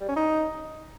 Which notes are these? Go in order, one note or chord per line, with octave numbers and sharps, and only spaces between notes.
G3
C#4
D#4